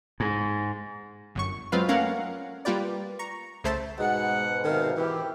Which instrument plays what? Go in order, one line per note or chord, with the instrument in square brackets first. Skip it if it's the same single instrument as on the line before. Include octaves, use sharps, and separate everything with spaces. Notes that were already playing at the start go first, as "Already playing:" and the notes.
[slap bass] G#2
[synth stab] G1 F#2 C#6
F#3 G#3 C4 F4 B4 F5
A3 A#3 C#4 A#4 F5 F#5
G3 A#3 F4 G4 B4 D5
A#5 C#6
C2 C#3 A3 C5 E5 A5
[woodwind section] G#2 B2 [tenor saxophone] G#3 [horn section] F#5
[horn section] C3 F5 [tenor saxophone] D#3
[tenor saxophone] E3 [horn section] E4 G4